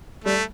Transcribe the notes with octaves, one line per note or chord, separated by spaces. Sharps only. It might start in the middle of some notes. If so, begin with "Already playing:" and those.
G3 A3